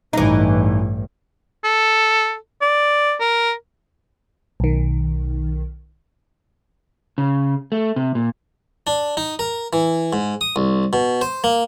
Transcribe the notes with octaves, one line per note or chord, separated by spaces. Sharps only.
A1 G2 E3 D#4
A4
D5
A#4
B1 D#3
C#3
A3
C3
A#2
D4
D#4
A#4
E3
G#2
D#6
C2
B2
C5
A#3